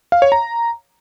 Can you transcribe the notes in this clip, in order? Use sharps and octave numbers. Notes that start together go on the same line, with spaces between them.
F5
C#5
A#5